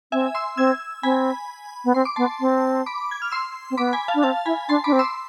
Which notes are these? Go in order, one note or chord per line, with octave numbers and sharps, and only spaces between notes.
C4 E5 G#5
C6 E6
C4 E6 G#6
C4 G#5 B5
B3
C4 C6
D6
B3 A5 C6
C4
B5 D6
G#6
F6
C6 E6
C4
B3 B5 D6
G#5 B5
F5 A5
D4
C4 F5 A5
E4 G#5 B5
D4 A5 C6
D4 B5 D6
C4
C6 E6